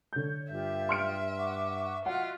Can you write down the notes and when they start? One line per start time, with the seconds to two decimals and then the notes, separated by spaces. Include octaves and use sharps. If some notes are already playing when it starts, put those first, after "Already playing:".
0.13 D3 C#5 G6
0.52 G2 F4 G4 E5
0.89 C6 F6 D7
1.38 F#5 C#6 D6
2.06 F4 F#4 D#5 E5 F#5